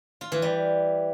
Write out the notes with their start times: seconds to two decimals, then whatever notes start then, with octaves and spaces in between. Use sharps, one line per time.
0.21 F4
0.32 E3
0.42 G3